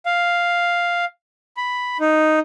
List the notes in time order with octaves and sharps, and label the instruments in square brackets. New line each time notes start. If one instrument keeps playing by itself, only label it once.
[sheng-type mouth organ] F5
B5
D#4